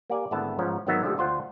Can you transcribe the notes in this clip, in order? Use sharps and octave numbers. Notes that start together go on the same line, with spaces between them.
A#3 G4 D5 G#5
G#1 D3 A3 B3 E4 A5
G#2 F3 B3 C#4 D#4
G#1 D#3 F#3 B3 D#4 E5
D3 F3 G#3 A3 G4
D2 F4 C5 F#5 G5